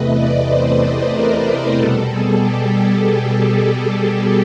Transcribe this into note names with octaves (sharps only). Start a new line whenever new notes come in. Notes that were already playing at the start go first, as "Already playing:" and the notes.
Already playing: E2 C3 E3 A3 B4 D#5
D5
C5
A#4
B2 G3 A4
G#4
G4